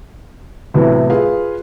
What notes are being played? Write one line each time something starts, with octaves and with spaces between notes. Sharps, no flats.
A2 C3 E3 F#3 B3
F4 G#4 B4 F5